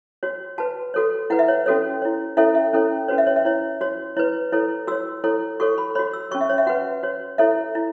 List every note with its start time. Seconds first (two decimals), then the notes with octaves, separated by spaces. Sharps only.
0.23 F#4 C#5
0.58 F#4 B4 A5
0.94 F#4 A4 C#5
1.30 E4 B4 F#5
1.39 E5
1.48 C#5
1.66 C#4 F#4 A4 C#5
2.02 E4 C#5
2.37 C#4 E4 A4 C#5 E5
2.55 E5
2.73 C#4 E4 A4 C#5
3.08 C#4 F#4 B4 C#5
3.18 E5
3.27 C#5
3.36 E5
3.45 E4 C#5
3.81 F#4 C#5
4.17 E4 B4 C#5
4.53 E4 A4 C#5
4.87 F#4 C#5 E6
5.24 E4 A4 C#5
5.60 F#4 A4 C#5 C#6
5.78 B5
5.95 F#4 C#5 B5
6.13 E6
6.31 C#4 F#4 C#5 C#6
6.41 E5
6.49 C#5
6.58 E5
6.67 F#4 B4 F#5
7.03 F#4 C#5
7.38 E4 A4 C#5 E5
7.75 E4